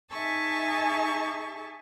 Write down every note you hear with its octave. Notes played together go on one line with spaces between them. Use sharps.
D#4 G#4 E5 G#5 A5 C#6